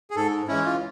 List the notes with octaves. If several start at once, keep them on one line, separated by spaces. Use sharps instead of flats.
G#4
G#2 A4
E3 G#3 C#4 E4
F4